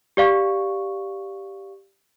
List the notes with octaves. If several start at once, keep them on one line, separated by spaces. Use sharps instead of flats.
G4 D5 F5 C#6